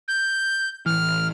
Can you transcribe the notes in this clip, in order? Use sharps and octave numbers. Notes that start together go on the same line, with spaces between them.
G6
A1 E3 F6